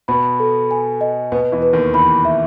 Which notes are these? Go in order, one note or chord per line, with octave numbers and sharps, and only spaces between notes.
B2 B3 B5
A4
G#5
D#5
B2 B3 B4
E2 E3
B4
D#2 D#3
E2 E3 B5
E5